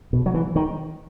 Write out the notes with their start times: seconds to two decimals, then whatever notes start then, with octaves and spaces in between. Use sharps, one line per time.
0.13 B2
0.26 F#3
0.34 E3
0.56 D#3